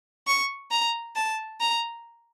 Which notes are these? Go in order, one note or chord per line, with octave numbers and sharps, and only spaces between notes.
C#6
A#5
A5
A#5